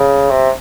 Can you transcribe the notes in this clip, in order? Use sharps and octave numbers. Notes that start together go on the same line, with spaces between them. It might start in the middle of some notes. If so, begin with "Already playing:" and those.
Already playing: C#3
C3